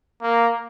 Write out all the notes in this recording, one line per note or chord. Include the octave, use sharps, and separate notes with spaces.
A#3